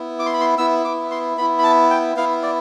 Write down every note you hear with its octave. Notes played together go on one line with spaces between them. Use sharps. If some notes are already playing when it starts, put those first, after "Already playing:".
Already playing: B3 E4
D6
C6
B5
C6
B3 E4 E6
D6
C6
B3 E4 B5
B5
A5
G5
B3 E4 F5
D5